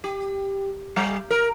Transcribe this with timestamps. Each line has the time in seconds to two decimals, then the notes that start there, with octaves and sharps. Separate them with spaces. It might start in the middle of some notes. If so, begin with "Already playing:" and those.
0.04 G4
0.96 G3
1.31 A#4